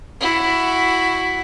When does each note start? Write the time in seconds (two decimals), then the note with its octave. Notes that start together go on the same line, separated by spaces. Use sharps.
0.21 E4 F#4